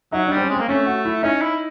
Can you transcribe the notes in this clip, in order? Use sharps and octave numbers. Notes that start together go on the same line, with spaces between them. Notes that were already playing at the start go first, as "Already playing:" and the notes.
F#3 D#4
D4
G3 C4
C#4
G#3 C4
A#3
A3 C#4
F#4
E4
C#4 D#4
E4